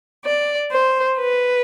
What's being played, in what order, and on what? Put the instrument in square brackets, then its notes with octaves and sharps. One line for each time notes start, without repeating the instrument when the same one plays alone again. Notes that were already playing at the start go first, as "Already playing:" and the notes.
[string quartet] D5
C5
B4